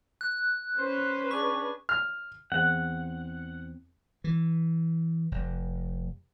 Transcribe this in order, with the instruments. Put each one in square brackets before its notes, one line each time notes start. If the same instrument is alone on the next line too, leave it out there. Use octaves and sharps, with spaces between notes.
[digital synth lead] F#6
[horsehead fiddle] C#4 B4 [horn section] C5
[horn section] D4 G#4 [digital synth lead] C#6
[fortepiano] F6
[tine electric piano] E2 C4 [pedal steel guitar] F#5
[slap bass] E3
F1